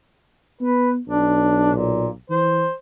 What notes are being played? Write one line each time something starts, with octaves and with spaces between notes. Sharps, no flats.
B3 B4
B1 D4
A#2
E3 C5